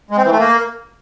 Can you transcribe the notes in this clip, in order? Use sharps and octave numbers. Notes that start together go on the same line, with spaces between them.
G#3
C4
E3
A3
A#3